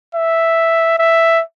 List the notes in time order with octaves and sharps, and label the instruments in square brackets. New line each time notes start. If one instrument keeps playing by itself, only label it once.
[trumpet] E5
E5